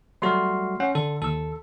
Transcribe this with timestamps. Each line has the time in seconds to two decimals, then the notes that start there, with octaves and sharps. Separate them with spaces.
0.22 F#3 G3 A3 F#4 C6 F6
0.80 C#4 F#5
0.95 D3 A4
1.22 D#2 A4 E6